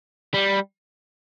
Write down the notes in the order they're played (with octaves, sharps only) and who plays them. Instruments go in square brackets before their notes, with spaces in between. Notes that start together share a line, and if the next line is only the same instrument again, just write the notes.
[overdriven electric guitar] G3